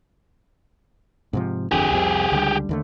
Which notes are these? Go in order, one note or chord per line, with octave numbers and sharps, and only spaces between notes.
G#2 C3 F3
G1 F2 D3 G4 G#4
C2 F2 C3
C#2 D3 G3
D#2 D3 A3